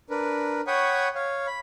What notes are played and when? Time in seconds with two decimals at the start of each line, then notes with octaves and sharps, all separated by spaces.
0.10 D4 A#4 B4
0.67 C#5 F#5 G5 B5 C#6 D#6
1.15 C#5 F5
1.47 B5